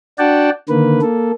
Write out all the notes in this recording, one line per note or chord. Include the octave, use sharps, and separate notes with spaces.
D4 F#4 D5 F#5 G5 A5
D3 D#3 A#3 B4
A#3 A4